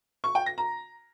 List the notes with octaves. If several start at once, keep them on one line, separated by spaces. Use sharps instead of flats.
C#6
G5
A#6
A#5